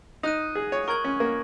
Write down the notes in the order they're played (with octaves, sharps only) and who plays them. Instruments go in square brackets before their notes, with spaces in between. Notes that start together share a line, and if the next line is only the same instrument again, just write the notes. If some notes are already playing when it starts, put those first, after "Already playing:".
[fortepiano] D#4 [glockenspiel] D#6 F#6 D#7
[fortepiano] G#4
C#5
[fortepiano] A#4 [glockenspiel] C#6 G#6 F#7
[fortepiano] C#4
A#3